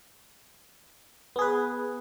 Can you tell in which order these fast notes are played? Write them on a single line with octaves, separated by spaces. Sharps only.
B3 G#4 B4